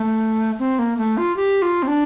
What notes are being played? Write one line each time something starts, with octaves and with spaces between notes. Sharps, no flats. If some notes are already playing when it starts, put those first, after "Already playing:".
Already playing: A3
C4
A#3
A3
F4
G4
F4
C4
D4